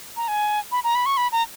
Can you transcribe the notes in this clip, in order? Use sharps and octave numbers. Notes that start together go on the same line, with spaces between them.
A#5
G#5
B5
A#5
B5
C#6
B5
A#5